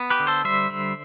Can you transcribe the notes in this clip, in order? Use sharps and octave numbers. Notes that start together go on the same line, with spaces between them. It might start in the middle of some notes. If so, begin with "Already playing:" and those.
Already playing: B3
G4 B4
D3
A4 C5
G3 C5 E5
D3